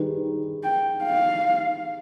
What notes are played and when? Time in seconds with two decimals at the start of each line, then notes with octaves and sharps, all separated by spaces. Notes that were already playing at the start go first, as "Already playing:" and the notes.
Already playing: D#3 G3 D4 G#4 B4
0.63 G5
1.04 F5